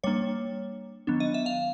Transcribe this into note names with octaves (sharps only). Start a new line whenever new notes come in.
G3 A#3 D4 C#5
D#3 F#3 B3 D4
D#5
E5
F5